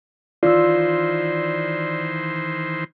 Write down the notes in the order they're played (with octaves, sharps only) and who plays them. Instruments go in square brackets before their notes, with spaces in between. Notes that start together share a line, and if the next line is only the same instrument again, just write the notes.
[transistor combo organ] D#3 E3 C5 [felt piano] F4 [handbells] D5 E6